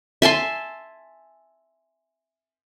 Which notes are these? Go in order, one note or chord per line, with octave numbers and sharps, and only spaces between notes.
E5 G#5 A5 C6